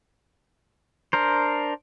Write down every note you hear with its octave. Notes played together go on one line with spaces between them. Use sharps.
D4 A#4 C5